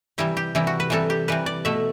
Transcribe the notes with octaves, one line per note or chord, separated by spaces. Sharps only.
C3 E3 G3 E4
G4
C3 E3 G3 E4
F#4
B4
C3 E3 G3 A4
G4
C3 E3 G3 B4
D5
B2 A3 E5